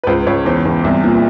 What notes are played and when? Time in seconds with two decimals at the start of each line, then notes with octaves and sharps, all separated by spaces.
0.04 B4
0.07 C#2 C5
0.26 C#2 C#5
0.45 E2 C5
0.65 E2
0.84 C2
1.03 A#2